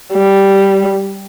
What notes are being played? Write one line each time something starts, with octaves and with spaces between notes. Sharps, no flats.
G3